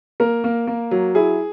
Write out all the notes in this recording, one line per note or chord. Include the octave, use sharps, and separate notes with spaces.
A#3 A#4
A#3
A#3
F#3
E4 G#4